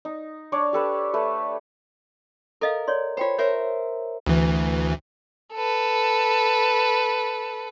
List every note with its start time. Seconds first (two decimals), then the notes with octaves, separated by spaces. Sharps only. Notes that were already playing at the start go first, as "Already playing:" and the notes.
0.05 D#4
0.52 D4 C#5 D5
0.73 G4 A4 B4
1.14 A3 B4
2.61 A4 A#4 D#5 F5
2.88 C#5 D5 C6
3.17 F4 C5 C#5 G5 B5
3.38 A#4 C5 C#5 E5
4.26 D2 E3
5.54 A4 B4